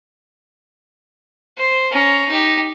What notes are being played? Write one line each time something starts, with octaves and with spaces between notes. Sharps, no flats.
C5
C#4 A#5
D#4 G4